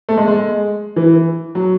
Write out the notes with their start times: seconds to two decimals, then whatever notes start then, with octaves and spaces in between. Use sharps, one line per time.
0.09 A3
0.17 G#3
0.28 G#3
0.96 E3
1.55 F#3